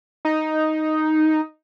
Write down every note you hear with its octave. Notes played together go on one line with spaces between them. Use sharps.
D#4